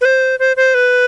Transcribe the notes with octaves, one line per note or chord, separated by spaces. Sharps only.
B4
C5
C5
C5
B4